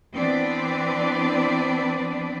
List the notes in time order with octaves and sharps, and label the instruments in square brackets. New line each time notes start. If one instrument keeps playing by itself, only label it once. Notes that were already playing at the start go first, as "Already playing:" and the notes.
[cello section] E3 B3 C4 D4 B4 D5